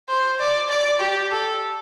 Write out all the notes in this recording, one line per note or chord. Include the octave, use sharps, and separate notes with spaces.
C5
D5
D5
G4
A4